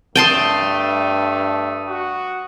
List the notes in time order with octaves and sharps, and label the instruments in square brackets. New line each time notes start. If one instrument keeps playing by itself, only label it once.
[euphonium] G2 [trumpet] A3 [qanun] G5 A5 C6 [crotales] D#6 D#7
[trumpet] F#4